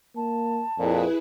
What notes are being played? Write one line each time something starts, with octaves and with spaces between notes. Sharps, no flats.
A#3 A5
F2 A#2 E4 G#4 B4